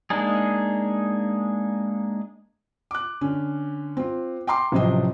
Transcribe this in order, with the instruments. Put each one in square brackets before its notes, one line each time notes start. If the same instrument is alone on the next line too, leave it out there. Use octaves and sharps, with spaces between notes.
[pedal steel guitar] G#3 A#3 D4 D#4 G#4
[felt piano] D6 F#6
D3 C#4
C4 F4
G5 A#5 C6 D6
A1 C3 F3 F#3 C5 D#5